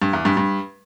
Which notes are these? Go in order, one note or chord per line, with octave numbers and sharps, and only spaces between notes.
G2
E2
G2
G2